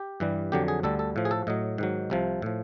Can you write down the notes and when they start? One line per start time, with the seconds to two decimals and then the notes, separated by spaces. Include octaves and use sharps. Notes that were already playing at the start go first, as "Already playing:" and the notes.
Already playing: G4
0.20 G2 E3 G3
0.52 F2 D3 F#3 G4
0.68 G#4
0.83 D2 D3 G3 A4
0.99 A4
1.16 A2 F3
1.25 G#4
1.31 A4
1.47 A2 F#3 D#5
1.78 G#2 D#3 F#3
2.10 C2 C3 F3
2.42 A2 F3